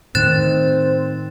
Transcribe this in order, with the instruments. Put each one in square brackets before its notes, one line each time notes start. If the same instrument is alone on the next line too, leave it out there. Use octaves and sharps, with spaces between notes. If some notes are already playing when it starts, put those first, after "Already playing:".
[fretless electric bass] A2 D#3 [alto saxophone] C4 [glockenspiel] F#6 A6 E7